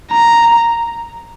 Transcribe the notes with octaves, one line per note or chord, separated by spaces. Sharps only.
A#5